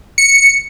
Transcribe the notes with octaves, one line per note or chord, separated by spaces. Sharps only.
C#7